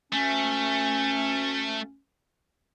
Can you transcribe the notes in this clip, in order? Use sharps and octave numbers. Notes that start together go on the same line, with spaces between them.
D2 A3 C#4